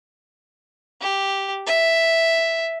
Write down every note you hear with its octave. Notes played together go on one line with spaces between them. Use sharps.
G4
E5